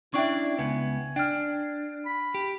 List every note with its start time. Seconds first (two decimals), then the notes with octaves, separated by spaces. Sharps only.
0.14 C#4 D4 E4 D5 E5 G5 C#6
0.59 C#2 B3 G#5
1.16 D4 G5 F6
2.05 B5
2.35 G4